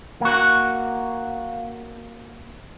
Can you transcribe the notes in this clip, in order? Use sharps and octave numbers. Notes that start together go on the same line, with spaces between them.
A#3 F#4